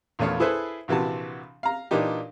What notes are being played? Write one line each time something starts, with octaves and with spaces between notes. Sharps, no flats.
A#1 E2 A3 C#5 F5
E4 G#4 A4 B4 C5
A#1 C3 E3 F#4 A5
F5 A#5
A#2 E3 D4 D#4 G4